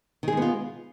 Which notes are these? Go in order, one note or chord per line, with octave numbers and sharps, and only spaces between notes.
D#3 G#3 B3 F4 G#4